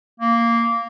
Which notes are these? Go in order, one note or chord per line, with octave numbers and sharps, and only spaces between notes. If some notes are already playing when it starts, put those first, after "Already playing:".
A#3